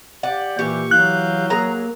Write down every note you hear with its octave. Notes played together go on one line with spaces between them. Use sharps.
G4 D5 F#5
A#2 E3 G4 C#6
E3 F#3 F5 F#6 G6
A#3 G#4 A#5